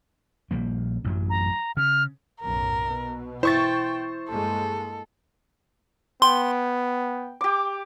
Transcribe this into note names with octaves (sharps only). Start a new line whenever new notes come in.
A#1 G3 A#3
A1 F#2 F#3
A#5
C#3 F6
B1 F#2 A2 A#4
B2 B3
E4 C5 G5 C#6 A6
G2 G#3 A#3 A4
B3 G5 C6
G4 D6